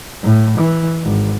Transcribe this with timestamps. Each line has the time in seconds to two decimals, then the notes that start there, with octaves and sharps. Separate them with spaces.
0.23 A2
0.58 E3
1.03 G#1